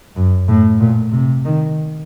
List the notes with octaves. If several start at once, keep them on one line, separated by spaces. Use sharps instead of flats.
F#2
A2
A#2
C3
D#3